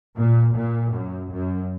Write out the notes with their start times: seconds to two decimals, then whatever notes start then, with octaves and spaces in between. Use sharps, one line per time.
0.16 A#2
0.55 A#2
0.93 F#2
1.32 F#2